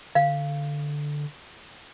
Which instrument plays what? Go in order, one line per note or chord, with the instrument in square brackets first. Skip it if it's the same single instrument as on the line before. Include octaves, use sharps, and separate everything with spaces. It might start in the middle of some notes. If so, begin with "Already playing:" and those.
[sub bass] D3 [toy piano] F5